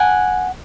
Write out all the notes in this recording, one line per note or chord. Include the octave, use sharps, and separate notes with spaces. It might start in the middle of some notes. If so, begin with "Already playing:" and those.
Already playing: F#5 G#5